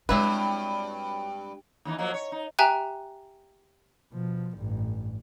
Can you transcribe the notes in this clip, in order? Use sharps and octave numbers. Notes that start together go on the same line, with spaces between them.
G2 F#3 G#3 C4 E4 B4 B5
D#2 E3 D#4
F3 F#3 A#3
C#5
D#4
G4 E5 G5 G#5 A#5 F#6
B2 F3
A1 G2